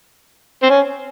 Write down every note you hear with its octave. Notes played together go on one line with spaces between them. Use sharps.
C4
C#4